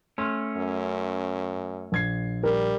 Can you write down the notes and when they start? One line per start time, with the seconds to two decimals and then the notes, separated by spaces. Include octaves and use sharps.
0.18 A3 C#4 C6 F6
0.57 F#2
1.92 A#1 G#6 C7
2.43 G3 A#4